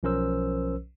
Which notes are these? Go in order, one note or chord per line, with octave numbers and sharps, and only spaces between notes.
B1 F3 C#4 A#4 C5 E6